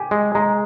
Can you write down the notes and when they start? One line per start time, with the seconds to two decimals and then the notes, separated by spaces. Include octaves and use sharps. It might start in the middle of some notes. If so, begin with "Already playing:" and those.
Already playing: G4 G#5
0.11 G#3
0.35 G#3 A#5